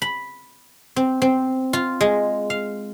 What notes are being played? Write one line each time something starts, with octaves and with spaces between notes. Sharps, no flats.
B5
C4
C4
F4
G#3
F5